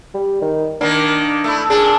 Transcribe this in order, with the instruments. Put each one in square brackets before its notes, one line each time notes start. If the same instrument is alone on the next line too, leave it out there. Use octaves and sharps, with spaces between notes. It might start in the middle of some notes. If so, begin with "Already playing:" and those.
[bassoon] G3
D#3
[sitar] D#3 A#3 [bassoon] D4
[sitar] A3 E4
[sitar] A#2 D4 [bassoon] G#4